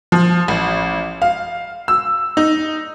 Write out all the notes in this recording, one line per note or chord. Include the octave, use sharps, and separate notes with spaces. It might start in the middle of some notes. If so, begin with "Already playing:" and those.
F3
A1
F5
E6
D#4